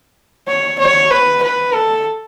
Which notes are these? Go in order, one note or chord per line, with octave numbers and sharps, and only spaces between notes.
C#5
C#5
B4
B4
A4